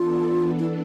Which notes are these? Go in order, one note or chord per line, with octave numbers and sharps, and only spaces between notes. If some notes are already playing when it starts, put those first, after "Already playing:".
Already playing: E3 B3 D4 F4 A4
E4